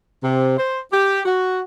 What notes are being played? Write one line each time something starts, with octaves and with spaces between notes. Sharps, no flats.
C3
C5
G4
F#4